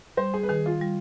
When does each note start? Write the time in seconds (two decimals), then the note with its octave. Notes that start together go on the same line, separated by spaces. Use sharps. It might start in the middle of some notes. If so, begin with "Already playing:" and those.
0.17 G3 C5
0.34 G#4
0.43 B4
0.49 D#3 G#4
0.66 F4
0.81 G3